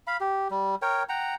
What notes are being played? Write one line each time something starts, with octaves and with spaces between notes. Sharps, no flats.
F5 B5
G4
G3
A#4 C#5 G5
F#5 G5 A#5